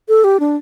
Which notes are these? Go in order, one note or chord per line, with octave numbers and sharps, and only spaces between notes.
A4
G4
D4